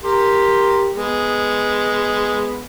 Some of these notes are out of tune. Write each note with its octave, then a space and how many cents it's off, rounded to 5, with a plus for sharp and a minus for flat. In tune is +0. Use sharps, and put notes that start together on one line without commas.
G4 +5 A#4 +0 C6 +0
G#3 +0 B3 +0